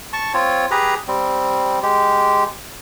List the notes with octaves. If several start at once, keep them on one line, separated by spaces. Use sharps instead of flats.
A5 C#6
C4 F4 C#5
G4 G#4 B4 A#5
G3 C4
G#3 G4